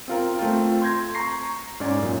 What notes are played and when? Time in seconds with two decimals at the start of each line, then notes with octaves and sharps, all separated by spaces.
0.08 C4 F4 A#4
0.39 A3 C4 F4
0.82 C6 G6 G#6 A#6
1.15 A#5 C#6 A#6 C7
1.80 G#2 C#4 D5
1.99 F#2 A#2